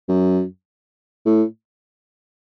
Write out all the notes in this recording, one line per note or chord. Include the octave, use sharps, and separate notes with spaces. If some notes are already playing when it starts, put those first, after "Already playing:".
F#2
A2